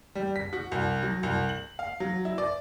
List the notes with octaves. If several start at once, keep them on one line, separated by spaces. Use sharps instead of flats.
G3
B6
F#4
C2
F#3
C2
F#7
F5
F#3
E4
D5